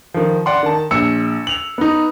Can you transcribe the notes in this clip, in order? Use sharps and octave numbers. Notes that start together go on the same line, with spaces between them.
D#3 F3
D5 F#5 C6
D#3 A5
A#1 E6 C#7
F7 F#7
B3 D#4